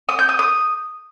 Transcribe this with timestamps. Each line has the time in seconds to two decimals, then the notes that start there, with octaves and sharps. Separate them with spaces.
0.09 D#6
0.19 G6
0.29 D#6
0.39 D#6